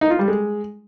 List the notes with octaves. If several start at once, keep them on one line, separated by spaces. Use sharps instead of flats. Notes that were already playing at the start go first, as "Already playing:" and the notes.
D#4
F4
G3
G#3